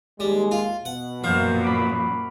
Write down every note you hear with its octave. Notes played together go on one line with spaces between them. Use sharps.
D#2 G3 G#3
F4
B2 F#5
F#2 A#2 F3 F#4 C5 F5
B5 D6